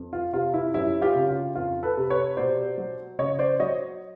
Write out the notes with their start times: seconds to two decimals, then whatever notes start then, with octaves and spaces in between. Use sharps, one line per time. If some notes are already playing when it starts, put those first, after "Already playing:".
Already playing: F2
0.13 F4
0.33 C3 F4
0.54 E4
0.74 F#2 E4
1.02 F4 G4
1.15 C#3
1.29 F4
1.55 F2 F4
1.83 A4 B4
1.97 C3
2.10 B4 C#5
2.37 B2 C5 D5
2.78 F#3
3.19 C#3 C#5 D#5
3.39 C5 D5
3.60 F#3 C#5 D#5